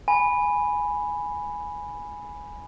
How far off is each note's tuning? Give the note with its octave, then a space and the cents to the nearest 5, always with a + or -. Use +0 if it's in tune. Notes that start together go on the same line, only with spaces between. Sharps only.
G#5 +0 B5 +0